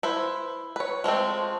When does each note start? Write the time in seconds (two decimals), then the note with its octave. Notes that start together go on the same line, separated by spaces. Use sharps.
0.03 E4 B4 C5
0.76 B4 C#5
1.04 F3 G#3 A3 C4